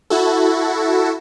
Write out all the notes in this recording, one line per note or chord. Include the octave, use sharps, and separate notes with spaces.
E4 F#4 A4